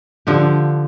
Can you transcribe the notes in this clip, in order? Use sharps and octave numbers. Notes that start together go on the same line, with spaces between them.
D3 F3 G4